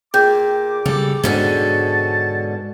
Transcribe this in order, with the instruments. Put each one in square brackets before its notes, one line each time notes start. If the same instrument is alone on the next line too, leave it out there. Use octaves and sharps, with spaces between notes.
[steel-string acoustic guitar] A#2 [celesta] G#4 G5 G6 [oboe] D6
[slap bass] C#3 G3 [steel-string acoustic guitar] A4
[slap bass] G#2 [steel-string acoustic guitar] B2 D3 C#4 [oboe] A5